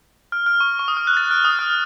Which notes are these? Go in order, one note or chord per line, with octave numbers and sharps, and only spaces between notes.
F6
F6
C#6
C#6
D#6
F6
F#6
A6
F6
D#6
F6